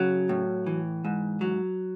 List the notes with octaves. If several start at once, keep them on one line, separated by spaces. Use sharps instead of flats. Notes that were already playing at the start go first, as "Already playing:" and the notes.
Already playing: C#3 F#3
A2
E3
G#2
F#3